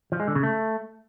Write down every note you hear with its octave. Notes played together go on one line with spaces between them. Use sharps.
F3
G#3
D3
C#3
A3